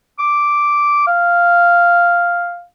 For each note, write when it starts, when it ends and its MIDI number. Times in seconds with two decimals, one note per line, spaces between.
0.19 1.05 86
1.06 2.62 77